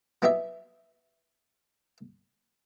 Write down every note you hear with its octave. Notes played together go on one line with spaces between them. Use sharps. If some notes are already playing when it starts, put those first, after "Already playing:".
F#3 B3 E4 G4 D#5 E5